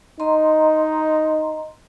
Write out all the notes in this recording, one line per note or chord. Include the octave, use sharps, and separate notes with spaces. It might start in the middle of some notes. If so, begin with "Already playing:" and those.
D#4 D#5 A#5 C6